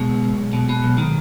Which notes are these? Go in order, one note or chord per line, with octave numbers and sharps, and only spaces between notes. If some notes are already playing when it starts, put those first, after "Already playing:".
Already playing: B2 G#3
C#2
C#2
B1
B2
B2
B1
D#3